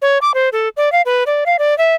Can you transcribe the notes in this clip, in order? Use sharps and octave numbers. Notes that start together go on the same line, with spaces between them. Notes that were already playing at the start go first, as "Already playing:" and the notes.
C#5
D6
C5
A4
D5
F5
B4
D5
F5
D5
E5